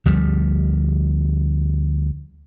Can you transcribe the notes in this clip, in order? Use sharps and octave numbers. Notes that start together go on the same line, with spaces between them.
D2 F3 G3